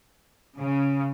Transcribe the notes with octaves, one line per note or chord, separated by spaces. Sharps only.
C#3